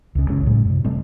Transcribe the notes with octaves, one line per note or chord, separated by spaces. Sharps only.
C#2 C#3
F#1 C#2 G#3 C#4
A2 F#3 G#3
F#2 C3
C3 G3 A3 C4